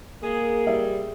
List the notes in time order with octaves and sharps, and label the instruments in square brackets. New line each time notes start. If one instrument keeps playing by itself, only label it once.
[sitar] G#3 [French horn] A#3 [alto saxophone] G#4
[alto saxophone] G3 [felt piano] E5